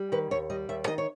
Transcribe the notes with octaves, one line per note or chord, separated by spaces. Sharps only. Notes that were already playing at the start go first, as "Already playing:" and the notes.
Already playing: G3
D#3 B4
D#2 C#5
G3 D#5
D#2 E5
D#3 D#5
C#5